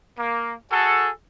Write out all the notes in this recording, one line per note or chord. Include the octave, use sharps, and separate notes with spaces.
A#3
F#4 G#4 A4